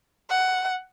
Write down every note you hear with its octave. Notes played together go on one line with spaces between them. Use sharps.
F#5